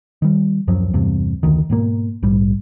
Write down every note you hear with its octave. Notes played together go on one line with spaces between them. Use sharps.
D#3 G3
D1 F#2 F3 F#3
E2 G2 C3
F1 D2 D#3
G#2 B2 A#3
A#1 G#2 G3